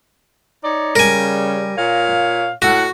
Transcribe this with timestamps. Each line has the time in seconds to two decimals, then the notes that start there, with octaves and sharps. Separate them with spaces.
0.62 D#4 C#5 D5
0.96 C#3 G3 A#4 G#5
1.76 A#2 C#5 F5
2.62 A2 F#4 A4 F#5